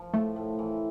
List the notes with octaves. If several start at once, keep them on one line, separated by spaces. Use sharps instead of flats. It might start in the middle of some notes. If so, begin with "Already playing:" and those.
Already playing: F3
A2 A3
A2
E3